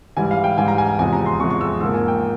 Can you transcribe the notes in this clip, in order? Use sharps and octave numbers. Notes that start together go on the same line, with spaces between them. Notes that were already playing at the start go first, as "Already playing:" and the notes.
G#2 E3 G3 G#5
F5
G5
G#2 E3 G3 G#5
A#5
G#5
G#5
E2 C3 F3 G#3 G#5
A#5
C6
E2 C3 F3 G#3 C#6
C#6
E6
G#2 F3 A#3 E6
G#5
G5